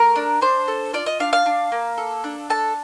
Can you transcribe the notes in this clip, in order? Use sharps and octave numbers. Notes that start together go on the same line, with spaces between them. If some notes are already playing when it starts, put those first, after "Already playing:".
Already playing: A3 A#4
D4
D4 C5
A4
F4 D5
D#5
D4 F5
F5
D4
A#3
A4
D4
A4 A5